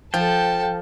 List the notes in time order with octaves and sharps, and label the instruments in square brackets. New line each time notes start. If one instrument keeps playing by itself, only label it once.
[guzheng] F3 [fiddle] A4 A5 [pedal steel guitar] G5